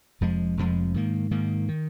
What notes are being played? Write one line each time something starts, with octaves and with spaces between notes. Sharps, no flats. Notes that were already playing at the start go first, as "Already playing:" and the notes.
F1 F2 F3 G#3
F1 F2 F3 G#3
G#2 D#3 A#3
G#2 D#3 A#3
D#3